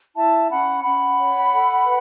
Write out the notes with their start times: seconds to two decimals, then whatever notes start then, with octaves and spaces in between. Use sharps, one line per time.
0.16 E4 E5 A5
0.50 C#4 F#5 B5
0.83 C#4 F#5 B5
1.17 C#5
1.51 A4
1.85 B4